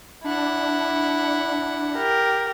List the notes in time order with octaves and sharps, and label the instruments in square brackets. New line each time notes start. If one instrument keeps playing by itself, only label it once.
[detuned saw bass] D4 [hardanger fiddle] E4 F#5
[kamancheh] G4 A#4